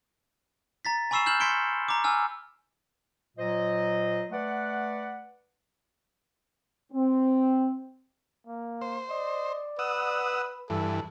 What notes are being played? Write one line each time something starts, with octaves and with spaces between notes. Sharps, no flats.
A#5 A6 B6
G#5 B5 C#6 E6 C7 E7
F6 G6 E7 F#7
C6 G#6 B6 C#7 D7 G7
A#5 D6
G#5 E6 F6
A#2 F#3 C5 D#5
A3 B4 D5 F#5
C4
A#3
C5
D5 D#5
B4 F#5 D#6 E6
G2 E3 A4